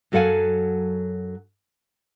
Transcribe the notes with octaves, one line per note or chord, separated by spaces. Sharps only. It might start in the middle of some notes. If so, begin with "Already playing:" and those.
F#2 F#3 A4 F5 F#5 G#5